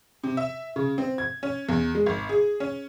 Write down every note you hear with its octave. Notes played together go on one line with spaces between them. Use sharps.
C3
E5
C#3
C4
G#6
C#4
E2
G#3
G#1
G#4
C#4